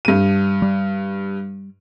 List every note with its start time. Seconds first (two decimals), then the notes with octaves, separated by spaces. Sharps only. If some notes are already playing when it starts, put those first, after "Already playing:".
0.05 G2 D#7
0.62 G3